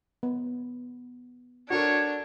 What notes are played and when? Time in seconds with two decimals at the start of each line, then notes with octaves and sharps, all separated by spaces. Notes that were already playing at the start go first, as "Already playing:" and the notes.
0.23 B3
1.70 D4 F#4 A4 A#4 C#5